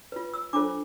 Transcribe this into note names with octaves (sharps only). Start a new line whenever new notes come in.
F4 B4
E6
D4 F4 A4 C5 D6